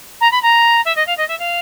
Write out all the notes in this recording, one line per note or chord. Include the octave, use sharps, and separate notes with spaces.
A#5
B5
A#5
E5
D#5
F5
D#5
E5
F5